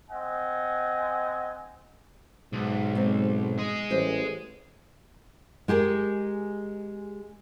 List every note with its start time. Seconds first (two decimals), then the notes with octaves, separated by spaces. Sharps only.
0.10 C4 D#5 F#5 G#5
2.53 B1 G#2
2.95 G#3 A#3 C4
3.58 G#4 D#5
3.90 A1 G3 C5 E5
5.68 G#3 G4 G#4 A#4